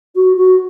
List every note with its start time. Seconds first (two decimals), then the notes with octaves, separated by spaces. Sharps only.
0.15 F#4
0.36 F#4